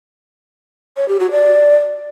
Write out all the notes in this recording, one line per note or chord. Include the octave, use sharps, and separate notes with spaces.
C#5
G4
F#4
D5